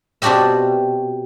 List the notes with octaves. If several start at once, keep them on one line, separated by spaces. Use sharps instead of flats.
B2 C4 D4 F#4 G4 E5